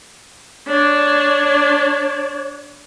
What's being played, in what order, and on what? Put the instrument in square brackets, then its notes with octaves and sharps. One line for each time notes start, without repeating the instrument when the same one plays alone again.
[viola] D4 [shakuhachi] C#5